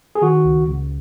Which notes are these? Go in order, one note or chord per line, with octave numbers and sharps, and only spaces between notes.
G#4
D#3 F#4
C#2
C#2